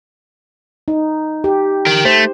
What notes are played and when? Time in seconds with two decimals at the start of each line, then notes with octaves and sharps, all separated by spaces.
0.88 D#4
1.44 G4
1.87 A#4 G5
2.05 A3 C5